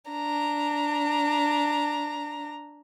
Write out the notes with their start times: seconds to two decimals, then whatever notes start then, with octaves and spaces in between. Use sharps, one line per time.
0.11 D4 A#5